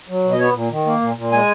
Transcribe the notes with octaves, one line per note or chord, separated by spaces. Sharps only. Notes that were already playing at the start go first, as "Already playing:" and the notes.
F#3
B2
D#5
B3 C#5
A#2
D#3
A#3
A#2
A#2
G#3 G#5